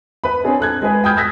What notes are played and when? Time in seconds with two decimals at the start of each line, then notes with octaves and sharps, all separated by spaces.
0.24 B4 B5
0.44 C4 D4 G#4 C#5
0.60 A4 F#6 G#6
0.82 G#3 G#4 B4
1.04 G5 B5 D#6 F6 G6 G#6
1.16 D#6 E6 F#6 G#6 A#6 B6